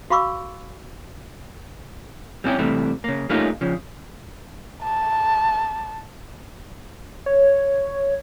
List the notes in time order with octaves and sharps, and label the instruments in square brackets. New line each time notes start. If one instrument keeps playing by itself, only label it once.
[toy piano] F#4 F5 B5 C#6 D6 E6
[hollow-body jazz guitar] G3 C4 C#4 D#4 E4 G4
C3 E3 G3 A3 C4
C#3 A#3
G3 A3 A#3 C#4 D#4 F4
C#3 F3
[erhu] A5
[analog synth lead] C#5